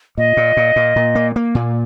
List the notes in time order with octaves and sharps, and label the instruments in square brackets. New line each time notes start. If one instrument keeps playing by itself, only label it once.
[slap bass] A#2 [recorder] D#5
[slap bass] A#2
A#2
A#2
A#2
A#3
A#3
A#2